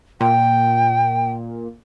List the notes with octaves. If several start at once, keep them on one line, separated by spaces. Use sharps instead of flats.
A#2 G5